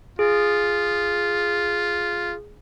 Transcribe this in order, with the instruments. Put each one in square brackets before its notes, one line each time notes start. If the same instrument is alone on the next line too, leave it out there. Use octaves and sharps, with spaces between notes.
[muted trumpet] F4 [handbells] G#4